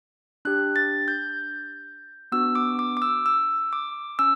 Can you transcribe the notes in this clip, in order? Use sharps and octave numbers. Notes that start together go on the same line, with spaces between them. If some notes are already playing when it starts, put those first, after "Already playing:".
D4 G4 F#6
A6
G6
B3 D4 F#4 E6
D6
D6
D6
E6
E6
D6
C#4 E6